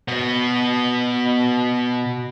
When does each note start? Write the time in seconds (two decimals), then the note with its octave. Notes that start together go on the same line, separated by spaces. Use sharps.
0.08 B2 B3